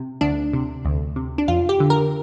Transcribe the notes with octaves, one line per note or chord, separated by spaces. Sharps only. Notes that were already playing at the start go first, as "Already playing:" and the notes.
Already playing: C3
D2 D4
C3
D2
C3
D4
F2 F4
G4
D3
A#4